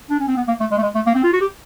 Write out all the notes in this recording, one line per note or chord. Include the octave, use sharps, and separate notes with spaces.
D4
C#4
C4
B3
A#3
A3
G#3
A3
G#3
A3
A#3
C4
F4
F#4
G4